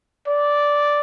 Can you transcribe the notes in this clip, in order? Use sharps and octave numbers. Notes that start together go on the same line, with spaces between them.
D5